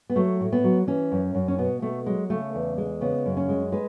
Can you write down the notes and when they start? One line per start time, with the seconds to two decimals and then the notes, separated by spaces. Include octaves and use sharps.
0.10 B3
0.16 F#3 A3
0.40 A2
0.53 B3
0.64 F#3
0.87 E3 C#4
1.12 F#2
1.35 F#2
1.48 C#4
1.58 B2 B3
1.82 B2 A3
2.06 F#3 G#3
2.30 C#3 A3
2.55 E2
2.78 G#3
3.01 C#3 B3
3.26 F#2
3.37 C#4
3.49 G#3
3.72 G#3 B4